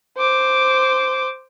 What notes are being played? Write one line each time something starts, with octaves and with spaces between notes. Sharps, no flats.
C5 D6